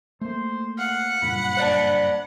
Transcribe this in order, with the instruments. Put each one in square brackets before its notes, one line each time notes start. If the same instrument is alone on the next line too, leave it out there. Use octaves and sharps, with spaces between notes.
[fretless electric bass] A3 A#3 [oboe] C5
[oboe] F5 [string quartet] F#5
[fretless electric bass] F#1 G2 A#2 [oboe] B5
[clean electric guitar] C5 D5 A5